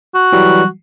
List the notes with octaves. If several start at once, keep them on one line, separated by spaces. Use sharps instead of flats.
F#4
E3 F#3 G3